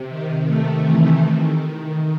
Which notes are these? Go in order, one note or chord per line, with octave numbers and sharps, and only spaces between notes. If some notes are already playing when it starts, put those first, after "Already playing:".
Already playing: C3
D#3
A3
E3
D#3